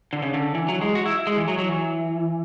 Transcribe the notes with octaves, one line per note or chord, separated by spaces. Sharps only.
D3
C#3
D3
E3
F#3
G#3
F#4
E4
G#3
E3
F#3
F#3
E3